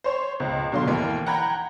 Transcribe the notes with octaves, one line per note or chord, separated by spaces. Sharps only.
C5 C#5
C#2
B2 D3 F#3 F5 C6
D#2 E3 A#3
F#5 G5 A#5 B5 G#6